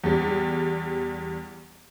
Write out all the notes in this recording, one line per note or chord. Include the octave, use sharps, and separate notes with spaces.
E2 G3